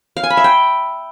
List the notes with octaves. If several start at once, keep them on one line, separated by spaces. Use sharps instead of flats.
F5
G#5
B5
E5
G5